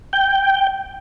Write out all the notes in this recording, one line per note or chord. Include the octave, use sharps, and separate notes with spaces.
G5